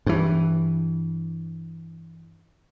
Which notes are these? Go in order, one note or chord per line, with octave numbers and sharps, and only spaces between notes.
G2 E3